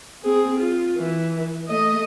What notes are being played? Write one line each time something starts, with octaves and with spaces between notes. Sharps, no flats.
C4 G#4
F4
E3
A3 D#5